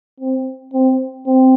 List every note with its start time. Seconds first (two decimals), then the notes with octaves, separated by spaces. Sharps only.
0.20 C4
0.73 C4
1.26 C4